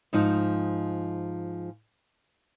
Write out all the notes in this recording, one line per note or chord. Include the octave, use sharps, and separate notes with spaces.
G#2 F3 D#4